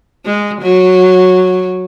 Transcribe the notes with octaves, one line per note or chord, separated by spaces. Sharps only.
G#3
F#3